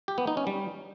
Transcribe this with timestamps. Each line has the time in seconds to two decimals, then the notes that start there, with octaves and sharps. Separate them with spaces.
0.08 G4
0.18 B3
0.27 D#4
0.37 C#4
0.47 G3